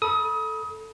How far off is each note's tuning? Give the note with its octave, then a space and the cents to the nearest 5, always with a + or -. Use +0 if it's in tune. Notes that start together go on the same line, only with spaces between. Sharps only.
A4 +0 B5 -30 D#6 +25